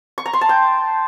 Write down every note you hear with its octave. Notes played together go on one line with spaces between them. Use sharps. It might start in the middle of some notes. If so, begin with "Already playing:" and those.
C#6
A#5
C6
A5
G5